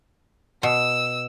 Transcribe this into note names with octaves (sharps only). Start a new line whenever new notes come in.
B2 E6